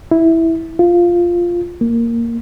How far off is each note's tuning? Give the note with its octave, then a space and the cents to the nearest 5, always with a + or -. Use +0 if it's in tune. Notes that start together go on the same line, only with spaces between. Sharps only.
E4 -5
F4 -5
A#3 -5